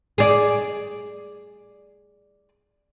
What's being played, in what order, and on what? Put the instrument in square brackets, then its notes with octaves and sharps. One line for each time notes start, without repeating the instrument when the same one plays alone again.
[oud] G#4 D5